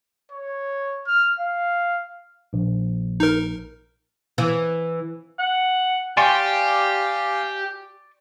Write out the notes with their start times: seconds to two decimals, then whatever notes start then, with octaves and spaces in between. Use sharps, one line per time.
0.32 C#5
1.07 F6
1.39 F5
2.53 A#1
3.20 D#4 A#4
4.38 E3
5.39 F#5
6.17 G4 D5 F5 G#5 C6 C#6